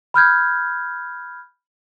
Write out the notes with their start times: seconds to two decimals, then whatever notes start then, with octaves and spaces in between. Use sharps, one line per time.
0.14 B5 F6 G6 G#6